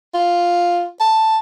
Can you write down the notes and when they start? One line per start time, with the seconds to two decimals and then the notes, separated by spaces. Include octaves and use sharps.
0.14 F4
1.00 A5